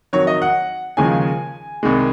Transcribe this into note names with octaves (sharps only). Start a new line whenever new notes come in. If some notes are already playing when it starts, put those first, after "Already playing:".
F2 D#3 F#3 C#5
D#5
F#5
D#2 C#3 F3 G#3 G#5
C2 C3 D#3 G#3